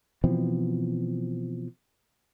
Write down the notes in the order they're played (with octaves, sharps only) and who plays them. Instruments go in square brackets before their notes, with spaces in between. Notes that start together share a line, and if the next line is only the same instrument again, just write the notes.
[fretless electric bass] B2 E3 F3 C4